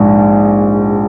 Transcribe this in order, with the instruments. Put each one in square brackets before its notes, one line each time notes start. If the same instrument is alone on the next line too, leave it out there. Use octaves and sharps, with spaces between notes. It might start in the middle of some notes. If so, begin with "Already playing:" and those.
Already playing: [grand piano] A#1 G#2